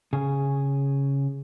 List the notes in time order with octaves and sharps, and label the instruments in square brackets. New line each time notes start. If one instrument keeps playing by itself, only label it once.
[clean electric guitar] C#3 G#4